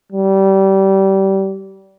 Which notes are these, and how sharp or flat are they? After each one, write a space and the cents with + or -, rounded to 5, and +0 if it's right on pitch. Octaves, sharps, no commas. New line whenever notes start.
G3 -25